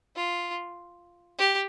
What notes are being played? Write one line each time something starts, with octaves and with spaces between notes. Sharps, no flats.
F4
G4